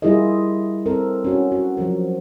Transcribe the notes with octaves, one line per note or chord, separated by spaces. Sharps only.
G3 E4 F4 G#4 A#4 D#5
C4 A4 A#4
C#4 F#4
F#4
F3 F#3 A#4